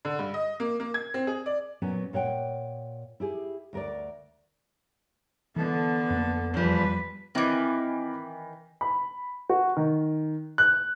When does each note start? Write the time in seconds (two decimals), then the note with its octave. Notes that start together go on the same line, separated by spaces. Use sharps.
0.05 D3
0.19 G2
0.34 D#5
0.60 A#3
0.80 A#3
0.94 G#6
1.14 C4
1.27 G#4
1.46 D5
1.82 A#2 F#3 B3 C#4
2.13 A#2 C#5 F#5 G5
3.20 E4 G4 G#4
3.73 D2 A#4 D5
5.56 D3 E3 B3 A4
6.10 F2 A#3
6.54 E2 F3 G3 B4
7.35 D#3 E3 C4 E4 D6
8.81 B5
9.49 F#4
9.76 D#3
10.58 F#6